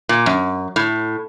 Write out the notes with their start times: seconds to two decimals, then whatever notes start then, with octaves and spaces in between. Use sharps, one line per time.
0.09 A#2
0.26 F#2
0.76 A2